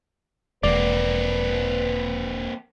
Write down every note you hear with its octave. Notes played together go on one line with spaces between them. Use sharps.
E1 A#3 C4 B4 D5